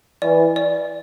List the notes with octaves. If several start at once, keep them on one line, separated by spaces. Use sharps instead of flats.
E3 D5
D5